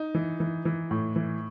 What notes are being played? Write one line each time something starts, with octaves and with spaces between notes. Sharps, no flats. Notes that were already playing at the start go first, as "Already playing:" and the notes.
Already playing: D#4
E3
E3
E3
A2
E3